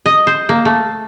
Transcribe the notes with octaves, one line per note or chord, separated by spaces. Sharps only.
D#5
C5
A#3
A3